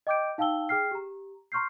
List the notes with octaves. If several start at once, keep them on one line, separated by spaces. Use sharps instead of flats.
D#5 G5 D6 G6 D7
D#4 F5 G5 A5 E6 G7
G#4 G5 F6 C7
G4 A#5
A#5 C6 C#6 F6 G6 C7